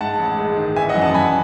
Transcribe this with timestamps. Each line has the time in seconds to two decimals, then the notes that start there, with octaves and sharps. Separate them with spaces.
0.01 G#2 F#5 A5
0.19 A1
0.39 G#3
0.57 D#3
0.76 E3 E5 G#5
0.89 D#5 F#5
0.95 F#2
1.01 F#5 A5
1.14 F#2 G#5 B5